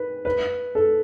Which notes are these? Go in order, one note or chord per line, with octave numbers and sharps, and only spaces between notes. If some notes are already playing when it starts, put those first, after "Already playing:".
Already playing: B4
B4
A4